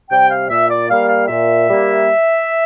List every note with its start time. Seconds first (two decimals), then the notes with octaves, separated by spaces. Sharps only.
0.10 C3 G3 G5
0.30 F5
0.49 A#2 E5
0.70 D5
0.90 G3 A#3 F5
1.08 F5
1.28 A#2 E5
1.68 G3 A#3